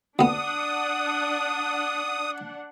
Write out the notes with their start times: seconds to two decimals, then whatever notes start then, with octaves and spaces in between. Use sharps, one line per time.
0.19 D2 B3 D4 F#5 D#6